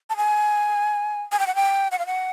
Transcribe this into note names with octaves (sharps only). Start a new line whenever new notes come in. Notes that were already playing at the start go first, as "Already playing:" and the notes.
A5
G#5
G#5
G5
F#5
G5
F#5
F5
F#5